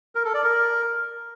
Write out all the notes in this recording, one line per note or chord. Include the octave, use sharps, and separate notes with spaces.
A#4
A4
D5
A#4